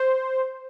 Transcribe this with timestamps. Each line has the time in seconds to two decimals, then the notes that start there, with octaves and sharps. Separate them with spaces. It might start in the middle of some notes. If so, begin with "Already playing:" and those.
Already playing: C5